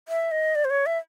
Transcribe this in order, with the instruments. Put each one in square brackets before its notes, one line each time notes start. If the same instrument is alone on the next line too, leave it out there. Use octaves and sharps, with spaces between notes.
[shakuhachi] E5
D#5
D5
C5
C#5
E5